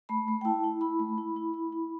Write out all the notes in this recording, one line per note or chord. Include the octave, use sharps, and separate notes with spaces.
A3 B5
A3
G5
E4 A5
E4
E4 B5
A3
E4
E4
E4
E4